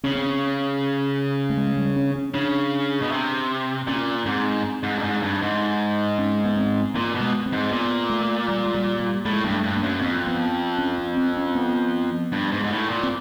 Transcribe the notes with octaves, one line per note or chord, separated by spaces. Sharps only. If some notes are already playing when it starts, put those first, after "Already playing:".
C#3 C#4
C4
C#4
A3
G#3
G3
C#4
C#4
C#3 D4
B2
C3
A#2 C#4
G#2 C4
G#2
G2
G#2
G2
G#2
C#4
B3
C4
A#2 A#3
B2
G#3
C4
G#2
A#2 B3
A3
G3
G#3
G3
G3
A2 G#3
G2 A#3
A3
G2
A#3
F#2
F2 C4
B3
C#4
C4
C4
C#4
B3
G2
G#2
G#2
A2
A#2
C4